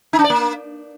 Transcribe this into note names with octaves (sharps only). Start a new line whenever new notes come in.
D#4
D4
D5
A#3